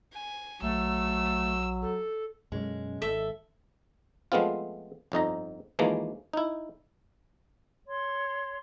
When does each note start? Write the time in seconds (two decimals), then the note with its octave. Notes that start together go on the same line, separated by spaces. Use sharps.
0.13 G#5
0.62 A#1 F#3 A3 E6
1.82 A4
2.52 F#2 B2 G#3 C#4
3.02 G#1 A4 E5
4.32 F3 G#3 A3 B3 C4 F4
5.12 G1 F2 D#4 A#5
5.79 D#2 E3 F3 G#3 A#3
6.33 D#4 E4
7.87 C#5 C6